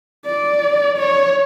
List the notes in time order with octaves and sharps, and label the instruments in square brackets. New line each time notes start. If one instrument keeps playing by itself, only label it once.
[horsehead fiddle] D5
C#5